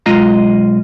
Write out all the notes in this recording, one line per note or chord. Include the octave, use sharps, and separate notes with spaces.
B1 G#3 F4 D#5 A#5